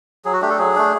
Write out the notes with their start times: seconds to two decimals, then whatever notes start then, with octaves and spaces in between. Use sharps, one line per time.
0.25 F#3 G#4
0.33 F#4
0.41 A3 D4 G4
0.50 A4
0.58 F#3 G#4
0.75 A3 D4